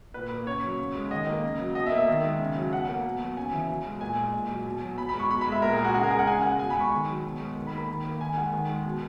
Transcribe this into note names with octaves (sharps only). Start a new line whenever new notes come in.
A#2 B4
A#3
C#3 C#5
F#3
C#3
G#3
D#3 D#5
A#3
C#3
F#3
B2 D#5
E5
A#3
E5
D#3
G#3
C#3
F#3
B2 F#5
A#3
B2
F#3
C#3 G#5
E3
B2
G#3
A#2 G#5
G#3
A#2
F#3
B2
F#3
B2 B5
B5
G#3
C#6
B2 B5
B5
G#3
E5
A#2 A#4
G#4
G#3
F#4
C#3 G#4
A#4
G#3 G#4
F#5
C#3 G#5
G#3 F#5
B2 G#5
B5
G#3
C#6
D#3
F#3
B2
G#3
D#3
B5
A#3
B5
D#3
A#3
D#3 G#5
G#3 F#5
D#3
G#3
B2